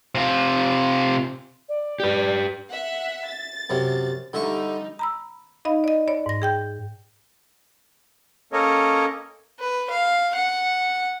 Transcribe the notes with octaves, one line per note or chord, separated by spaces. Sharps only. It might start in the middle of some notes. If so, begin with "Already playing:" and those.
C3 F4
D5
G4 B4
E5 F#5
A6
F#2 C3
D3 G3 D#4 E5 C#6
A#5 B5 E6
D#4 D#5 F5 B5
D5 D#5
C#5 D5 B5
G#2 A#6
G#4 G5 G6
A#3 C#4 A4 A#4 C#5 D#5
B4
F5
F#5